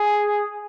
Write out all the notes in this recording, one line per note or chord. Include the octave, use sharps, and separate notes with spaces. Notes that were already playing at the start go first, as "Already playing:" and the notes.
Already playing: G#4